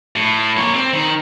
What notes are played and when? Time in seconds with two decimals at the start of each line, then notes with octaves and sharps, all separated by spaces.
0.16 A2
0.57 A#3 C#5
0.74 C4
0.93 D#3